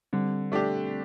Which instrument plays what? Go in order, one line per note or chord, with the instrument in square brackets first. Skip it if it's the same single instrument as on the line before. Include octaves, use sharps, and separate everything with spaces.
[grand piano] D3 [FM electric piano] G3 C4
[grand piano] A3 D4 G4